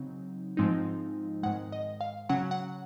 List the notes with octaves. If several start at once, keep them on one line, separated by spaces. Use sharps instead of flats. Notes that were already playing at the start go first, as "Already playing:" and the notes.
Already playing: C#3 F#3 C4 D#4
G#2 F3 G#3 C4 D#4
G#2 D#3 G#3 F#5
D#5
F5
C#3 F#3 C#4 F#5
F#5